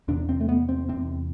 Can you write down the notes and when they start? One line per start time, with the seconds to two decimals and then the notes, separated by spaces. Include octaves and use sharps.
0.08 E2 C3 D4
0.29 C4
0.40 A3
0.49 B3
0.69 C4
0.89 E2 C3 C4